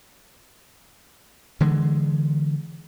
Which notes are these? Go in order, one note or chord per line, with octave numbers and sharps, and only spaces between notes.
D3 E3 G#3